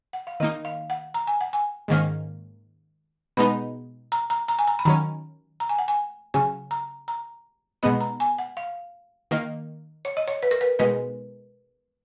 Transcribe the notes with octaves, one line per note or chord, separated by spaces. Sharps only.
F#5
F5
D#3 A#3 D#4 D#5
F5
F#5
A#5
G#5
F#5
G#5
G#2 D#3 A#3 C#4
B2 G#3 B3 D#4 B5
A#5
A#5
A#5
G#5
A#5
B5
D#3 F#3 C#4 A#5
A#5
G#5
F#5
G#5
C#3 F#3 C#4 G#5
A#5
A#5
B2 G#3 B3 D#4 B5
A#5
G#5
F#5
F5
D#3 A#3 D#4
C#5
D#5
C#5
B4
A#4
B4
B2 G#3 D#4 B4